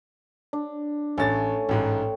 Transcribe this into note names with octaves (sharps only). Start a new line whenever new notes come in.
D4
A1 A3 C#5 G#5 A6
A1 G#2 G5